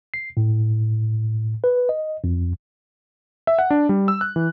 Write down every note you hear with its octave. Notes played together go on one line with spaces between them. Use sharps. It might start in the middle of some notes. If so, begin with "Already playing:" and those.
C7
A2
B4
D#5
F2
E5
F#5
D4
G3
E6
F#6
E3